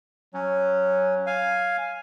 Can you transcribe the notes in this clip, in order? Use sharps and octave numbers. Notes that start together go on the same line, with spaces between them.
F#3 C#4
F5 G#5